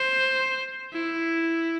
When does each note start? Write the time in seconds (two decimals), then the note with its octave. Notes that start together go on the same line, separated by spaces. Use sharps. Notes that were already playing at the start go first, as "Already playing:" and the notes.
Already playing: C5
0.93 E4